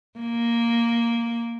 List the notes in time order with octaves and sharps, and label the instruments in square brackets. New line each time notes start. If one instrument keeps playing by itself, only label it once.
[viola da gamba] A#3